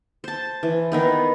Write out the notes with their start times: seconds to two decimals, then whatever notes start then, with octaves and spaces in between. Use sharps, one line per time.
0.24 C5 A5
0.63 E3
0.92 D#3 B3 D#4